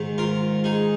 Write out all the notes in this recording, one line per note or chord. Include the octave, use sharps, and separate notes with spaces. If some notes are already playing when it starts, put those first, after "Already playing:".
Already playing: G#2 D#3
F4 A#4
D#4 G#4